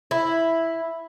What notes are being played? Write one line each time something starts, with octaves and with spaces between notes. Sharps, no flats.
E4